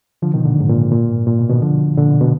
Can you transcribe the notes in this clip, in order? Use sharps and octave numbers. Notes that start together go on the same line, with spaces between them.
D3 F3
B2 D#3
A#2 D3
G#2
A#2
G#2
A#2
G#2
A#2
B2
B2 D#3
D3 F3
A#2 D3
B2
B2